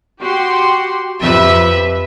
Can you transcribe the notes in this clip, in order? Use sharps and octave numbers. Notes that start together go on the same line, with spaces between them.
F#4 G4 C6
F2 F3 G4 B4 E5